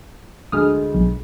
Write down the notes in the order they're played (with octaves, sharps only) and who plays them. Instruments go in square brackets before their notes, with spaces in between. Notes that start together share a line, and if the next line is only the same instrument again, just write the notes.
[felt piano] D2 G#3 G#4 [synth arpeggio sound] D#6 F6
[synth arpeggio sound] B1